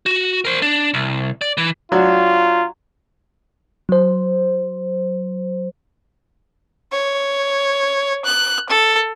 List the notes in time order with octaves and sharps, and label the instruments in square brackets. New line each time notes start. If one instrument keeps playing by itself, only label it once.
[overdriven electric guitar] F#4
A#4 C5
D4
C2
D5
E3
[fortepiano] F#3 D4 F#4 [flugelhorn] F4
[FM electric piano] F#3 C5
[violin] C#5
F#6
A4